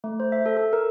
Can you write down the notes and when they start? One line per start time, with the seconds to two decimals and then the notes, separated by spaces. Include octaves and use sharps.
0.04 A3
0.20 C5
0.32 E5
0.46 A4
0.57 A4
0.73 A#4